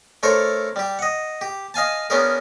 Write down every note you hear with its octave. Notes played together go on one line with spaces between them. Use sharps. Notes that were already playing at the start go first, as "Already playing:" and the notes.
A3 D4 A4 A#4 C5 C#5
G3 G4
D#5 F#5
G4
D#5 F5 G#5 A5
B3 C#4 D4 G#4 A#4